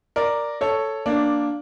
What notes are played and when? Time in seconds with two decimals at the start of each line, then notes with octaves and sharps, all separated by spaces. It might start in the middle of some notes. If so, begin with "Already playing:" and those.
0.16 A#4 D5
0.61 A4 C#5
1.06 A#3 D4